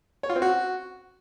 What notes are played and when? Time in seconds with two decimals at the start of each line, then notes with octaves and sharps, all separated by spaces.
0.23 C#5
0.30 F4
0.36 C4
0.42 F#4